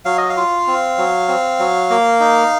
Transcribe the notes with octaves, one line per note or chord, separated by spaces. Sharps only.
F#3 F5
D#5
F5
F4
C4
F#3
C4
F#3
A#3
D#4